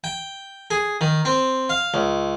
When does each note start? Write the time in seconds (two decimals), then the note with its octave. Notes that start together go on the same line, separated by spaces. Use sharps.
0.04 G5
0.71 G#4
1.01 D#3
1.25 C4
1.69 F5
1.94 C#2